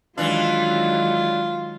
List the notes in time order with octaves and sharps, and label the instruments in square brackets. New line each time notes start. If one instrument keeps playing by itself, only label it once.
[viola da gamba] D#3 F#3 G#3 [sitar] E3 D4 [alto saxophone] F4